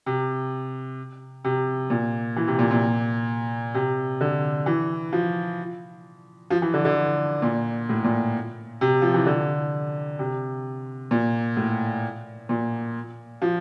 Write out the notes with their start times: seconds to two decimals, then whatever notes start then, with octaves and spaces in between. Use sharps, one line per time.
0.06 C3
1.44 C3
1.90 A#2
2.36 E3
2.47 C3
2.59 A#2
2.71 A#2
3.74 C3
4.21 D3
4.66 E3
5.13 F3
6.51 F3
6.62 E3
6.74 D3
6.85 D3
7.42 A#2
7.89 A2
8.04 A#2
8.81 C3
9.02 F3
9.14 E3
9.26 D3
10.19 C3
11.11 A#2
11.57 A2
12.49 A#2
13.42 F3